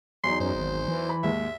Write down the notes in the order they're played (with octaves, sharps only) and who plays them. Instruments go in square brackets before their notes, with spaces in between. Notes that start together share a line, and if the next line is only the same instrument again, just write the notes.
[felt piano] E2 F#3 D#4 [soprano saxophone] C6
[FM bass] F#2 [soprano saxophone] C5
[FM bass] G#1
E3
[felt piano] B5
[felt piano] D#2 G#2 G#3 [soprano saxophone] E5